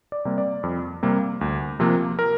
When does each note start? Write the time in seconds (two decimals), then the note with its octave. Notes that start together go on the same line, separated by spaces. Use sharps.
0.12 D5
0.25 C3 G3 A#3
0.38 D5
0.63 F2
1.03 C3 G3 A#3
1.41 D2
1.80 C3 F3 A#3
2.19 A#4